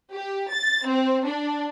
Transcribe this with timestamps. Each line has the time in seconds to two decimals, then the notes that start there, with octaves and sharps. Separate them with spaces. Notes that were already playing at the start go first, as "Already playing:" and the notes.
0.13 G4
0.50 A6
0.87 C4
1.26 D4